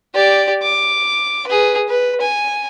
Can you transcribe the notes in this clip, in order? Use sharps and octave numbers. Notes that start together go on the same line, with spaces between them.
G4 D5
D6
G#4 B4
B4
G#5